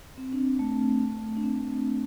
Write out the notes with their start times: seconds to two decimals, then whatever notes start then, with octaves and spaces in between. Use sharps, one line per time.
0.18 C4
0.33 D4
0.38 C4
0.59 A3
1.37 D4
1.43 C4